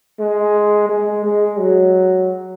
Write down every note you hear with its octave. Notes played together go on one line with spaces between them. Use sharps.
G#3
G#3
G#3
F#3